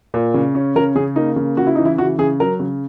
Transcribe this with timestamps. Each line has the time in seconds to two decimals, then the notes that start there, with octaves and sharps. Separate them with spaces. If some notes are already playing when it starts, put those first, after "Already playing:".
0.14 A#2
0.34 C#3
0.55 C#4
0.76 C#3 A#4
0.95 C#3 G#4
1.16 A#3 D#4
1.36 C#3
1.57 C#3 F#4
1.67 E4
1.75 E3 D#4
1.85 E4
1.98 C#3 F#4
2.18 C#3 G#4
2.40 F#3 A#4
2.60 C#3